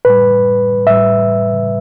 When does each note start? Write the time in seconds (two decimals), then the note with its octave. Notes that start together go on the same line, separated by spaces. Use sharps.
0.05 A2 G3 B4
0.86 A2 G3 E5